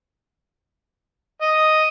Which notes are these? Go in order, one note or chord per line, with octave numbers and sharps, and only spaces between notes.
D#5